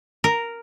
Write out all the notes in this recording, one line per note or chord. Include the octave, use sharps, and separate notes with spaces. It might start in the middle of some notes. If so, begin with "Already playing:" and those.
A#4